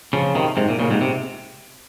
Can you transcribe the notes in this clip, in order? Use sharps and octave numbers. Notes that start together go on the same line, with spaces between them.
C#3 F3
C3 D#3
G#2 C3
A#2
A#2 C#3
G#2 C3
C3